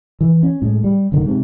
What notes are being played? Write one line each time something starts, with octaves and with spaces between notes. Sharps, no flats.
E3
C#4
A2 G#3
G3
F#1 D2 D3 D#3
G#2 C3